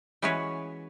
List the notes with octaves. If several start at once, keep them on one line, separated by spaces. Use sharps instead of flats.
E3 G#3 C#4 F#4 B4 C#5